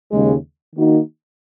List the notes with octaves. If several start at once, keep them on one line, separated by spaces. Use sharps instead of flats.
D#2 C#3 G#3
D#3 A#3 D#4 F#4